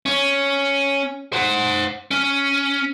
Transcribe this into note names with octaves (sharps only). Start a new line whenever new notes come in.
C#4
C5 F#5
C#4